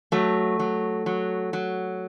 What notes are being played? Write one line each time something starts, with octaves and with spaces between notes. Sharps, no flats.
F#3 A3
F#3
F#3
F#3